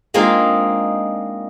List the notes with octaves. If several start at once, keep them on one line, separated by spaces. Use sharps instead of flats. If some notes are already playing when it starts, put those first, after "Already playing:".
G#3 A#3 C4 D4 D#4 F4